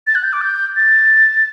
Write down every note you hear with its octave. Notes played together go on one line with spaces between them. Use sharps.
A6
F#6
G6
D6
G6
A6